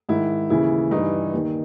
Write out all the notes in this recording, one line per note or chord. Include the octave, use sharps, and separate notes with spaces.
G#2 D#3 E4
D#2 C#3 E3 E4
G2 E3 D#4
D#2 D#3